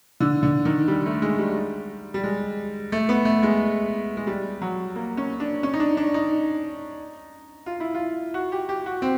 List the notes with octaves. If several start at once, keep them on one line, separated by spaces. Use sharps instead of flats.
D3
D3
D#3
G3
A3
G#3
G3
G3
G#3
A3
B3
A3
G#3
G#3
G3
F#3
A#3
C#4
D4
C#4
D#4
D4
D4
D#4
F4
E4
F4
F#4
G4
G4
F#4
C4